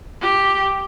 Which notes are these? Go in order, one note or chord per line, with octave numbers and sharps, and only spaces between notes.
G4